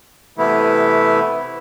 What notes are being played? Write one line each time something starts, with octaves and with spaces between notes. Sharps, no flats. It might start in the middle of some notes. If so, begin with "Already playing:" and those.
C3 E3 A3 B3 E4